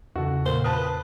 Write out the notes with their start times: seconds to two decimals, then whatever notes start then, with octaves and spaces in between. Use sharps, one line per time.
0.16 E2 C#3 F#4 A4
0.46 A#2 C5
0.64 B4 A5 D#6